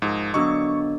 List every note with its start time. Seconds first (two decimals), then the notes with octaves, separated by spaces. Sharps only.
0.02 G#2 F3 G#4 A#4
0.34 D3 F#3 B3 D4 G#4 D#5 C#6